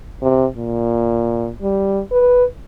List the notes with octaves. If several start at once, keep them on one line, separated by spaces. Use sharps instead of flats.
C3
A#2
G3
B4